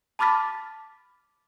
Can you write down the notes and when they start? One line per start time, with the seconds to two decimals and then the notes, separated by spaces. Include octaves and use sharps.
0.19 A5 B5 D6 F6 A6 B6